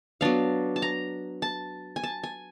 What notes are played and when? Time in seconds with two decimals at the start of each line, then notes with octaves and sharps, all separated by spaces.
0.21 F#3 B3 D4 F5
0.76 A5
0.82 A#5
1.42 A5
1.96 G#5
2.03 A5
2.23 G#5